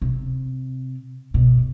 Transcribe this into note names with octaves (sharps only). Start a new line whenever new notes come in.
C3
B2